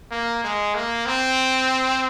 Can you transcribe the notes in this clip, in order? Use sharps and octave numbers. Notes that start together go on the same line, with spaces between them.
A#3
G#3
A#3
C4